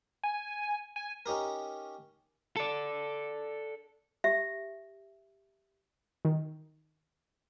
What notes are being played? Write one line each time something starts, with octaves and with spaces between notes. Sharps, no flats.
G#5
G#5
C#4 D#4 G4 A#4
A4 D5
G4 E5
D#3